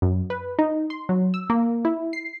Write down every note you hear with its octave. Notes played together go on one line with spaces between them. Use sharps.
F#2
B4
D#4
C6
F#3
E6
A#3
E4
C7